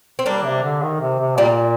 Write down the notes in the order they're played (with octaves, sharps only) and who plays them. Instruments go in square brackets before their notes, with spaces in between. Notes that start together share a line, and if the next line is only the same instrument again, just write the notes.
[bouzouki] C4
[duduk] G3 [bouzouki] A#3 D4
[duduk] C3
D3
D#3
C3
C3
[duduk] A#2 [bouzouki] G3 A#3